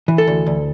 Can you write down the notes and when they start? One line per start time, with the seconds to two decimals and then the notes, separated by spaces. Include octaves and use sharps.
0.08 E3
0.18 A4
0.27 D2
0.46 D2